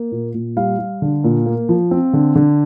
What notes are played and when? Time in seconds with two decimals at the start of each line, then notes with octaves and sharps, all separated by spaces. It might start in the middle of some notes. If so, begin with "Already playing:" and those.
Already playing: A#3
0.12 A#2
0.34 A#2
0.57 G3 F5
0.79 G3
1.02 D3
1.24 A#2
1.46 A#3
1.69 F3
1.91 C4
2.13 D3
2.35 D3